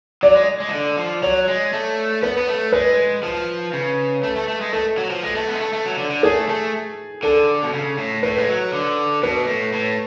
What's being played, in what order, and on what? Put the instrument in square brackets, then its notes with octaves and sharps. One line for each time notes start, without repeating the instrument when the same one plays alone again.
[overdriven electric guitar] F#3 [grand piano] D5
[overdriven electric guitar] G#3
G#3
F3
D3
F3
[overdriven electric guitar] F#3 [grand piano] C#5
[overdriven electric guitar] G#3
A3
[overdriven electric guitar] B3 [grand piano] B4
[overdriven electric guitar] B3
A3
[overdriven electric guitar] G#3 [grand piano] B4
[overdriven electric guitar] F3
C#3
A3
A3
A3
G#3
[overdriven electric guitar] A3 [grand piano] A4
[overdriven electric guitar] F#3
F3
G#3
A3
B3
G#3
A3
A3
F#3
D3
D3
[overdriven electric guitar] A3 [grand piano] G#4
[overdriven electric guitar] A3
[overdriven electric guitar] D3 [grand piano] A4
[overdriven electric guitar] B2
C#3
A2
[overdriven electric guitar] A2 [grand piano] B4
[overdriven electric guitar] G#3
F#3
D3
[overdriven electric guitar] B2 [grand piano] B4
[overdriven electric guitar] A2
A2